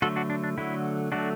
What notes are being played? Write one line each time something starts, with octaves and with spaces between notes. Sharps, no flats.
D3 F#3 A3 F#4 A4
D4 F#4
D4
D4
D3 F#3 A3 E4
D3 F#3 A3 D4 F#4